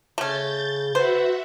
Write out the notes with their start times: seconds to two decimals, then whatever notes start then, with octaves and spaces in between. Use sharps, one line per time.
0.18 C#3 A3 C#4 G6 A6
0.95 F#4 B4 C5 E5 F#5